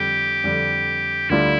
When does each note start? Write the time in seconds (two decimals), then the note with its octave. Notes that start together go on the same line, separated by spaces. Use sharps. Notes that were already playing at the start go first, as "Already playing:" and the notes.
Already playing: F2 D3 G3 G4
0.44 F2 D3 G3
1.30 D2 D3 G3 D4 E4 F4